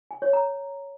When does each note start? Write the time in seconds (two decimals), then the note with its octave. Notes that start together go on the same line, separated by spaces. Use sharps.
0.11 G#5
0.22 C#5
0.33 A#5